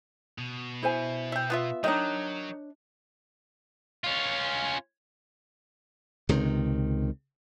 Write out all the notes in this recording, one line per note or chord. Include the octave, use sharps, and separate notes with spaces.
B2
E4 C5 G#5
E5 G5
B3 F4 E5
D#3 F#3 D4 D#4 C#5 D#5
C#4 F4
C#2 C3 D#3